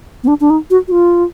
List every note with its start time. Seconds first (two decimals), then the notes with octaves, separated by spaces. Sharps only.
0.24 B3
0.28 D4
0.41 D4
0.50 D#4
0.70 F#4
0.88 F#4
0.92 F4